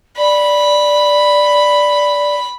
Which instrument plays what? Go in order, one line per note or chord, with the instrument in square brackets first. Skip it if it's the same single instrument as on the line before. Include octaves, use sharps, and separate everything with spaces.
[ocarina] D5 [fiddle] B5